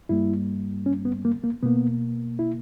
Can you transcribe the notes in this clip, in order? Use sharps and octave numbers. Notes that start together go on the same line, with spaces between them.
G2 G3 A#3 E4
C#4
B3
A#3
A#3
B2 A#3 B3
E4